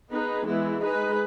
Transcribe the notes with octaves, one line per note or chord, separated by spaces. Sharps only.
B3 D#4 G#4 B4
E3 G#3 B3 E4
G#3 D#4 G#4 B4